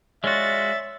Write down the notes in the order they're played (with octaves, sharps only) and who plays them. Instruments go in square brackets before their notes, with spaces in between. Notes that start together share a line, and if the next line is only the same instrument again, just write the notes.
[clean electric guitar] G#3 F4 F#4 [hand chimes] C#5 D5 [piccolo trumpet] E5 [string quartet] A6